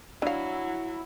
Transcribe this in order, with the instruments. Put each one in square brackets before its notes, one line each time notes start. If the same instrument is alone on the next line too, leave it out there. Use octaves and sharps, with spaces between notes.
[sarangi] F#3 [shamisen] D4 F5 [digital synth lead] E4